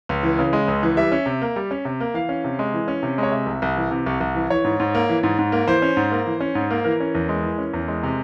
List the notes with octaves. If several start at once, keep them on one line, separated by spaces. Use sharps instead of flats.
C#2
E3
C#3
G#3
C#2
E3
G3 E5
C#4
C3
A#3
G3
C#4
C3
A#3
E3 F5
C#4
C3
G#3
E3
C#4
C3
G#3 C#5
C3 E5
C2
C2
E3
C3
C2
C2
E3
E3 C#5
G#2
G#2
A#3
E3
G#2
G#2
A#3
E3 C5
C#4
G#2
A#3
E3
C#4
G#2
A#3
E3 A#4
C#4
E2
G#3
E3
C#4
E2
G#3
C3